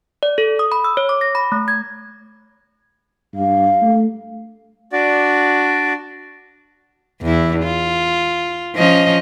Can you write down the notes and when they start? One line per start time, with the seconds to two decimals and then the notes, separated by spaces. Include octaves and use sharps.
0.23 D5
0.38 A4
0.59 D#6
0.72 B5
0.84 E6
0.97 C#5
1.09 D6
1.21 A#6
1.35 B5
1.52 A3
1.68 G#6
3.34 G2 F5
3.82 A3
4.93 D4 F#4 D5
7.22 E2 E4
7.64 F4
8.76 F3 C#4 D#5